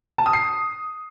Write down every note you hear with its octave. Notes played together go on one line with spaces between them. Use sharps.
A5
D#6
C7